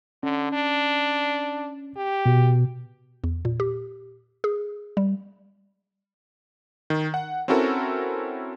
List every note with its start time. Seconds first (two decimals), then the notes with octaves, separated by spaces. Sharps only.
0.23 D3 C#4
0.52 D4
1.96 G4
2.26 B2
3.24 E2
3.45 A#2
3.60 G4
4.44 G#4
4.97 G3
6.90 D#3
7.14 F#5
7.48 C4 C#4 E4 F#4 A4 A#4